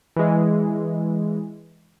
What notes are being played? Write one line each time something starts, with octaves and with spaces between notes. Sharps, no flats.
E3 G#3